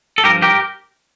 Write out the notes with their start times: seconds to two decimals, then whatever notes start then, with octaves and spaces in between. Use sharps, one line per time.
0.18 A4
0.24 G2 F3 G4 A#4
0.42 G4 A#4